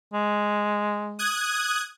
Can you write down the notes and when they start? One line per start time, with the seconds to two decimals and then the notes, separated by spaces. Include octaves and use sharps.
0.13 G#3
1.19 D#6 F#6 G#6